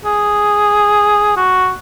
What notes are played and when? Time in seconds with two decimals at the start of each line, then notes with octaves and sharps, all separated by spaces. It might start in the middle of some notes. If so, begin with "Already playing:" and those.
0.05 G#4
1.36 F#4